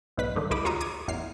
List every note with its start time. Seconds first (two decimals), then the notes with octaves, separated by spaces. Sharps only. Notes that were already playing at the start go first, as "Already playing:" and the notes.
0.17 B1 G#2 B4 B6
0.36 G2 D3 D#3
0.51 C#2 D#4 E4 B5 D6
0.64 D#2 F4 F#4 C#5 A#5 D#6
0.81 D6 D#6 G#6 D#7
1.08 A1 E2 F6 C7